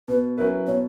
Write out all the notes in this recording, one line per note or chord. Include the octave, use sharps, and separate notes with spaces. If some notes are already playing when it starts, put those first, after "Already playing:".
B2 B4
F#3 C#4 E4 A#4 B4
B2 C#5